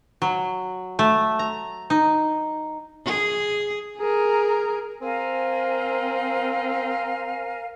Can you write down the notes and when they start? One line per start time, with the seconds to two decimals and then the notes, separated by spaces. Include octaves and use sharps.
0.22 F#3
0.99 A3
1.39 A#5
1.90 D#4
3.05 G#4
3.98 G#4 A#4
5.02 C4 A#4 F5 G#5